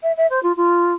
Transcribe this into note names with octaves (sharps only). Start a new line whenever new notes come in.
E5
E5
C5
F4
F4